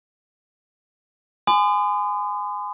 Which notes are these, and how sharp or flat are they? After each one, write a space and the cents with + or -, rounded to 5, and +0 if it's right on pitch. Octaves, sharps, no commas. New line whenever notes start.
G#5 +0 C6 -45 D#6 -40